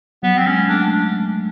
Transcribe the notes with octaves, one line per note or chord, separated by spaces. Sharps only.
F#3 B3
C4
G#3 C#4
A3 D4